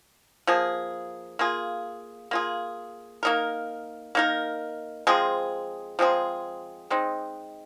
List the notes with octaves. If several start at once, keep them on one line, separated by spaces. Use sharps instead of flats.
F3 A#3 G#4
A#3 F4 G#4
A#3 F4 G#4
A#3 D#4 A#4
A#3 D#4 A#4
F3 G#3 C4 G#4
F3 G#3 C4 G#4
G#3 C4 D#4